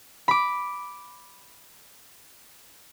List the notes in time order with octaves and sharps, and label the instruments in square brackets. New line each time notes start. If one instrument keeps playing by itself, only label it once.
[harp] B5 D6